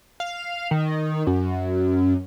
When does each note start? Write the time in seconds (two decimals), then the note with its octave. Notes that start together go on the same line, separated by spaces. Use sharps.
0.20 F5
0.71 D#3
1.27 F#2